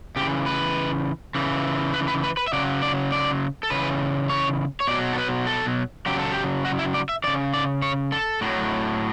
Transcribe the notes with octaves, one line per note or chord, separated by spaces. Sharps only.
C#3 E3 G4
B4
C#3 E3
B4
B4
B4
B4
E5
C#3 F#3 D5
D5
D5
A4
C#3 E3 B4
C#5
C#5
B2 F#3 D5
A4
B4
A4
C#3 F#3 G4
A4
G4
F#4
E4
D5
E5
C#3 E3 D5
D5
C#5
A4
A2 F#3